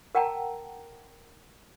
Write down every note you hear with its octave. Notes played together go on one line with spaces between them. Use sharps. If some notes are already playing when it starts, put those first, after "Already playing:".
A#4 F#5 G5 A5 A#5